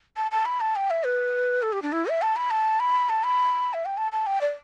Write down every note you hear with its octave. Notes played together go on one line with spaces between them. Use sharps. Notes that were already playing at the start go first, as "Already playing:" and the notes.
A5
A5
B5
A5
G5
E5
B4
A4
G4
D4
E4
E5
A5
B5
A5
B5
A5
B5
E5
G5
A5
A5
G5
D5